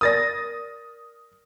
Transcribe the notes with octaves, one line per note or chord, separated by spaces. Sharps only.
A#4 D5 D#6 A6 A#6